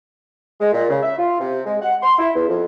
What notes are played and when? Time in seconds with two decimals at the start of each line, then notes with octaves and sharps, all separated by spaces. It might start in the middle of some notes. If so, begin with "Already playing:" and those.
0.60 G#3
0.72 A#2
0.90 C#3
1.03 E5
1.17 F4
1.40 C3
1.66 G#3
1.82 F#5
2.02 C6
2.19 E4
2.35 E2
2.48 F2